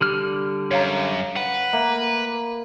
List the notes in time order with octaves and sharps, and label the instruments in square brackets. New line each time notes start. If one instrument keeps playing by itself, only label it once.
[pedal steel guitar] D3 G3 F6 [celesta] G4
[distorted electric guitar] F#2 [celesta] C#5 F5 A#5
[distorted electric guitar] B4 [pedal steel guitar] F#5
[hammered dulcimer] A#3 [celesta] E5